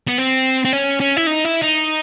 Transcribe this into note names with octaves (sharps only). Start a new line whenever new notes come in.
B3
C4
C4
C#4
C#4
E4
D#4
E4
D#4